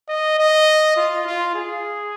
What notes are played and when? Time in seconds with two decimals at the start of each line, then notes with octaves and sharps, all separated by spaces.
0.09 D#5
0.39 D#5
0.97 F4
1.26 F4
1.55 G#4